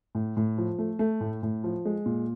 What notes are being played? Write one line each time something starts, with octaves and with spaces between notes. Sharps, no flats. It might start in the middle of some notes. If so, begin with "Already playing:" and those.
A2
A2
F3
A3
A3
A2
A2
F3
G#3
A#2